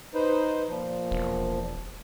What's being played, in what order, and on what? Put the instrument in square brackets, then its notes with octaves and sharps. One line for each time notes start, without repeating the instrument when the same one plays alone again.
[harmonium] D#4 B4 C5
A#2 F3
[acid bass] E1